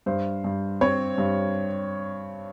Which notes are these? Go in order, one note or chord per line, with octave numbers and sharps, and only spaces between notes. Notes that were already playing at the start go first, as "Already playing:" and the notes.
G2 C5
G2
C4 C#5
G2